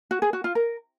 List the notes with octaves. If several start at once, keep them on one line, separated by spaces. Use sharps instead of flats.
F#4
G#4
F#4
F4
A#4